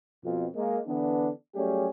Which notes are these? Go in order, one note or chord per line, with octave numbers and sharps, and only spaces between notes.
F2 B2
G#3 A#3
D3 E3 B3 D4
F#3 G3 A3 C#4 G4 G#4